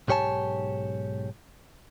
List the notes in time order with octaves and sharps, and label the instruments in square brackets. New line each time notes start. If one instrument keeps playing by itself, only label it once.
[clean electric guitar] B1 G#2 G4 C#5 G#5 A5